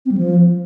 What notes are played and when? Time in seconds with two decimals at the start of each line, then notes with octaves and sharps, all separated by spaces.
0.06 C4
0.12 G3
0.17 F3